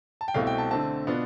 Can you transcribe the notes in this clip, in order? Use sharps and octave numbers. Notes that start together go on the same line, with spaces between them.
A5
G5
C2 B2 A3 C4 F5
G5
A5
D3 A3 C4 A5
B2 B3 D4 F4